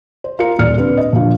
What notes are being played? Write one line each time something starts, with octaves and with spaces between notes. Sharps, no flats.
C5
F4 A#4 A#5 C#7
D#1 A#2 D5 F6 C#7
D3 C4 B4
D#5
A#2 D3 F3 F4